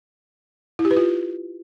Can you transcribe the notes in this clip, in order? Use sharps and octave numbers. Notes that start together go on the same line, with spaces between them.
E4
G4
B4
F4